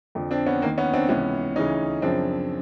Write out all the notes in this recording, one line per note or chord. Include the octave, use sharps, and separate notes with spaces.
F2 D3 F3
C4 D4
B3 C#4
D#2 D#3 A#3 C4
B3 C#4
C4 D4
C#2 C3 E3 B3 C#4
D2 C#3 E3 C#4 D#4
F#2 C#3 F3 C4 D4